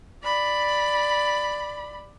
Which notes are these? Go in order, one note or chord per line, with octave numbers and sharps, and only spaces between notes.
D5 B5